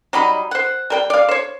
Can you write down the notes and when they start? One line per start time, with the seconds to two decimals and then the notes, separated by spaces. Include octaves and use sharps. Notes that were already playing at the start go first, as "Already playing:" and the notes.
0.13 F#3 G3 D#4 B5
0.51 C5 F#5
0.90 G3 A#4 G5
1.10 D5 F5
1.29 C5 C#5